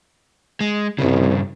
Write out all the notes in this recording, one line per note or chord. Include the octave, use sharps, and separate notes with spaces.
G#3
C2 G2 C#3